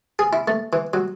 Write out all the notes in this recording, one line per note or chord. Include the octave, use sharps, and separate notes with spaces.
G#4
E4
A3
E3
F#3